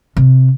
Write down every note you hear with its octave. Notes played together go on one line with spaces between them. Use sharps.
C3